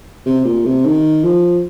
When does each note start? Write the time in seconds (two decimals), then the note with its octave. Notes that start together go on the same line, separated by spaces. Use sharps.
0.26 C3
0.45 A#2
0.65 C3
0.85 D#3
1.24 F3